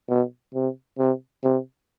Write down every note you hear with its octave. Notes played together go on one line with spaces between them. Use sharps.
B2
C3
C3
C3